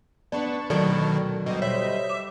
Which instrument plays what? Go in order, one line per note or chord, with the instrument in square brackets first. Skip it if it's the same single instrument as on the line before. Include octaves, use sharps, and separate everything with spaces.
[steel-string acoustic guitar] B3 D4 [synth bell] D5 [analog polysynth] A5 B5 C#6
[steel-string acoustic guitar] D2 F#3 A#4 [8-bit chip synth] B2 D#3 [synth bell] A4 D5
[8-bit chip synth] B2 [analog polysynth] G3 C5 D#5
[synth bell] C#5 [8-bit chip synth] E5
[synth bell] D6 E7